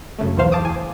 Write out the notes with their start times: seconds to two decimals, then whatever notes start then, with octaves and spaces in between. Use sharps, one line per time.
0.19 F#2 C#3 A3
0.37 B1 E2 E3 C5 F5
0.52 A5 D6 D#6
0.65 G#5